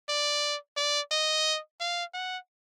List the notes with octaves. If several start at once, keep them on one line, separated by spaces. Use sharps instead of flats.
D5
D5
D#5
F5
F#5